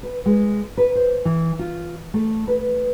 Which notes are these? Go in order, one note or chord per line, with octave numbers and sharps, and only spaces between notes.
B4
G#3
B4
C5
E3
F4
A3
B4